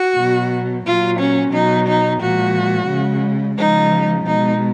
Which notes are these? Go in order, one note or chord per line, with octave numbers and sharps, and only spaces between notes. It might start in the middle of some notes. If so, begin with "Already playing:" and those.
Already playing: F#4
B2 F#3
A#2 F#3 F4
C#4
B2 F#3 D#4
D#4
A#2 F3 G#3 F#4
C#3 G#3
C#3 F3 G#3 D#4
B2 G#3 D#4